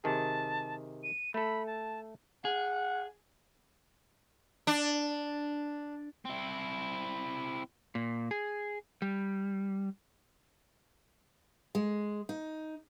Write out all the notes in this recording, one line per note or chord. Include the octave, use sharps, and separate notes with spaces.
C3 D#3 G#4 A5
D#7
A3 A4 B5
A5
G#4 F#5
D4
C4 E4
A#2
G#4
G3
G#3
D#4